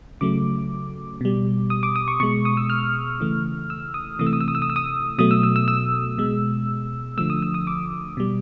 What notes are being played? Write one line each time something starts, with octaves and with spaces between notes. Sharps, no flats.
C#3 F#3 A3 D6
B2 G3
D#6
D6
D#6
C#6
B2 G#3 C#6
D#6
E6
F6
C#3 E3 A3
E6
D#6
C3 E3 A3 D#6
E6
D#6
E6
D#6
E6
D#6
E6
D#6
B2 F#3 A3 D#6
E6
E6
E6
E6
B2 G#3
D3 F3 A3 E6
D#6
E6
D#6
D6
B2 G3